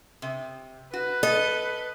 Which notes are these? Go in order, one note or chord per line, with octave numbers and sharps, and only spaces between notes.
C3
F#4 B4
A4 D#5